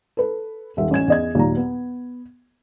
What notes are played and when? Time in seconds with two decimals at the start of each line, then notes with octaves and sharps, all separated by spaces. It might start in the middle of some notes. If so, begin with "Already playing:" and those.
0.17 A4 B4
0.77 D#1 E5
0.91 A1 C#4 G#6 E7
1.08 E2 D#5 G#6
1.35 D#2 A#2 F#3 A#5
1.57 B3